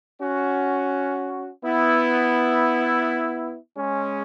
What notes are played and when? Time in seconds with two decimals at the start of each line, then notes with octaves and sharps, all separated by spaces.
0.21 C#4 F#4
1.64 B3 E4
3.77 G#3 C#4